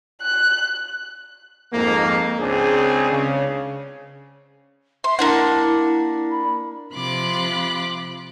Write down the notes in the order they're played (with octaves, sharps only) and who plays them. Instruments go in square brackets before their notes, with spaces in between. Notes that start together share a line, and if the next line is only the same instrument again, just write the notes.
[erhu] F#6
[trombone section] F2 G#2 A#3
C#2 C4 D4 G#4
C#3
[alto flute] E5 [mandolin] C6
[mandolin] A#3 D4 F#5 [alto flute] E4
[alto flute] B5
[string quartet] C3 F3 B5 C6 D6 F#6